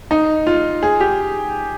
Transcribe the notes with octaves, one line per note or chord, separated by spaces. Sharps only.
D#4
F4
G#4
G4